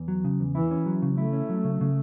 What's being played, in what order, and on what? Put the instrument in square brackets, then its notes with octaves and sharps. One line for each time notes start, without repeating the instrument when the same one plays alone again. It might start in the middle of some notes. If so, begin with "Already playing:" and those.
Already playing: [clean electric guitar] E2
F#3
C#3
E2
[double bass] E3 [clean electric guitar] E4
[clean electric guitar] C#4
F#3
C#3
[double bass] A3 [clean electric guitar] E4
[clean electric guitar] C#4
F#3
C#3
C#3